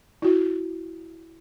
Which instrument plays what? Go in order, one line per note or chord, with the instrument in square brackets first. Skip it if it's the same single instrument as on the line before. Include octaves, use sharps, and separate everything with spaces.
[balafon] E4 F#4